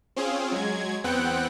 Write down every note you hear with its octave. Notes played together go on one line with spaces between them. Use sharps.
C4 C#4 F4 G#4
F#3 G#3 G#6
E2 B3 C4 F#5 G5 F#6